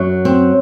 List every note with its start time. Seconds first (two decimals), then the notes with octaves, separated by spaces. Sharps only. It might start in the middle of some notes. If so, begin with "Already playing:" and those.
Already playing: F#2 F#3
0.25 C4